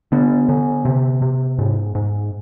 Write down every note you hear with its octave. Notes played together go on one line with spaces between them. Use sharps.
D3 B3
D3
C3
C3
G#2
G#2